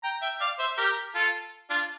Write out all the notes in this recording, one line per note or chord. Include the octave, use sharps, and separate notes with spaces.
G5 A#5
E5 G5
D5 F5
C5 E5
G4 A#4
F4 A4
D4 F4